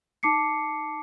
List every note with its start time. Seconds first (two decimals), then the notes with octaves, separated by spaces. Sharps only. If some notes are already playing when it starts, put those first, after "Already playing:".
0.23 D#4 A5 D6 C7 C#7